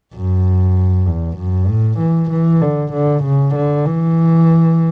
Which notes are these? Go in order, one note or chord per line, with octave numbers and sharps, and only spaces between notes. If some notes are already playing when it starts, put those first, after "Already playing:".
F#2
E2
F#2
A2
E3
E3
D3
D3
C#3
D3
E3